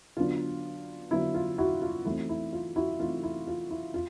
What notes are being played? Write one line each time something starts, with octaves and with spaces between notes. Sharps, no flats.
D3 F#3 B3 D4 F4
D3 F#3 B3 D4 E4
F4
E4 F#4
F4
E3 A3 C4 D#4 E4
E4
F4
E4 F#4
E3 A3 C4 D#4 F4
E4
F4
E4
F4